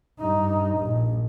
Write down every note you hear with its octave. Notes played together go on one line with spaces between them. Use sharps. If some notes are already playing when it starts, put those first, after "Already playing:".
G2 D#4
A#1